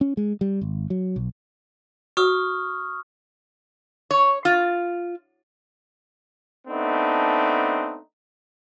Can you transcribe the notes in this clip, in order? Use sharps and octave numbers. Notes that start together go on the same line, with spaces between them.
C#4
G#3
G3
G#1
F#3
B1
F#4 C#6 D#6 F6
C#5
F4
A3 B3 C4 D4 D#4